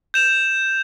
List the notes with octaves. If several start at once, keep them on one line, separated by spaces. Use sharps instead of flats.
G6 E7 F7